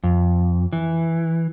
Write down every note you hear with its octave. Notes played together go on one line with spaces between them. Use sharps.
F2
E3